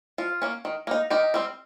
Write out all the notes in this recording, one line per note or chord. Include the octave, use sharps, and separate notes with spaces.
F3 F4
A#3 C#4
D#3
A#3 D#4
D#3 D#4 G4
G3 C4